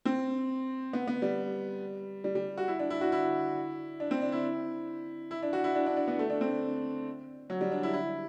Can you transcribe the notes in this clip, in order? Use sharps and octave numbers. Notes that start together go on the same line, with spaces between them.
C4
B3
B3
G3
G3
G3
F#4
E4
D4
E4
F#4
E4
D4
C4
D4
E4
E4
D4
F#4
E4
D4
D4
D4
B3
A3
D4
C4
F#3
G3
D4
E4
E4